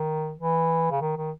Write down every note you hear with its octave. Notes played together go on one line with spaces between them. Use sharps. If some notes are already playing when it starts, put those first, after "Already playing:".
Already playing: D#3
E3
C#3
D#3
D#3